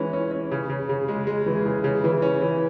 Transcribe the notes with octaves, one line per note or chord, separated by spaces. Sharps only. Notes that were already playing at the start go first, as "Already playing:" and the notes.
Already playing: E3 G#3 C#4
C#4
C#4
C#3
C#3
C#3
G#3
G#3
E3
C#3
C#3
E3
C#4
E3